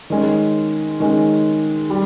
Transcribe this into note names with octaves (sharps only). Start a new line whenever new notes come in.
D#3 G#3 C#4
D#3 G#3 C#4
G3